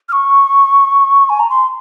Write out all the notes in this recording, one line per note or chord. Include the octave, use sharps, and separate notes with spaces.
F6
C#6
G#5
A#5
C6